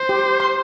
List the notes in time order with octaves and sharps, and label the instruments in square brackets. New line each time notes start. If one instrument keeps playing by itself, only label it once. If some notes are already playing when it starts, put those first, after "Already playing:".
Already playing: [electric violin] C5
[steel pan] G4
C6